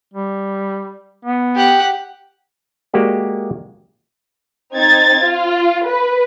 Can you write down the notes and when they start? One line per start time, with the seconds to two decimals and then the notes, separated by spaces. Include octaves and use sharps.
0.14 G3
1.25 B3
1.55 G4 F#5
2.93 G#3 A#3 F#4 G4 D5
4.75 C4 D#4 G#6 A6
5.24 F4
5.89 B4